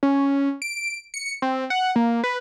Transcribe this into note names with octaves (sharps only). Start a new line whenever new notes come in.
C#4
D7
C#7
C4
F#5
A#3
B4